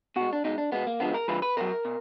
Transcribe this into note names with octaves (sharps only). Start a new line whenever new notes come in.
B2 G#3 F#4
D4
B2 G#3 D#4
D4
B2 G#3 B3
A#3
D3 F3 G#3 B3
A#4
D3 F3 G#3 B4
B4
B2 F#3 A#4
B2